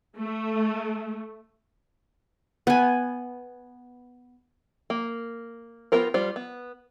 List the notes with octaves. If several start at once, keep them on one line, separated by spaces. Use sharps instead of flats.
A3
B3 G#5
A#3
B3 F4 G4 A#4 C5
G3 F4 C5
B3